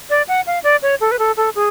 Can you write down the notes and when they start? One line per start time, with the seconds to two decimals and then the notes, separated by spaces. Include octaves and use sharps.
0.10 D5
0.28 F#5
0.47 F5
0.64 D5
0.82 C#5
1.01 A4
1.12 B4
1.19 A4
1.37 A4
1.55 G#4